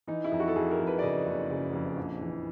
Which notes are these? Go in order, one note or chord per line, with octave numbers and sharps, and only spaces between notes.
E3 D#4
E4
F2
F#4
A4
F2 G#4
A#4
F2
B4
D5
C#3 D#5
F#1
F#1
F2
A#1
E3